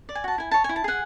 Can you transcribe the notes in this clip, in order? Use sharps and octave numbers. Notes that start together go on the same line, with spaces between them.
D5
G#5
F#4 A5
E4 G#5
C#5 A5
E4 G#5
A5
G#4 F#5 G#5